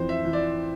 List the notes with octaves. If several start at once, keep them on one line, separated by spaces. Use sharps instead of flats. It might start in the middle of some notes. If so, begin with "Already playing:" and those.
Already playing: F2 E3 C5
E5
E3
D5